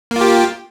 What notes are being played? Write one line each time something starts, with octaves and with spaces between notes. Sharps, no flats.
A#3 F4 G4